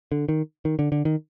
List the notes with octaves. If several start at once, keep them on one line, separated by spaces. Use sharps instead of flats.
D3
D#3
D#3
D3
D3
D#3